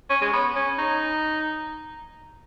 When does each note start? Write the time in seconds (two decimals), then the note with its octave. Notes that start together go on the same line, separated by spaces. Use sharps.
0.10 C#4
0.22 G#3
0.33 B3
0.56 C#4
0.78 D#4